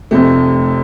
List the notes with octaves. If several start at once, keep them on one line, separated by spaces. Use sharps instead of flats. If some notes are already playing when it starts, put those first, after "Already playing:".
F1 F2 C3 A3